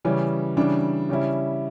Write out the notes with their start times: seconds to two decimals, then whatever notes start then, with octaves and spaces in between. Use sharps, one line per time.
0.05 C#3 E3 G3 C#4
0.57 C#3 E3 G3 D4
1.09 C#3 G3 C#4 E4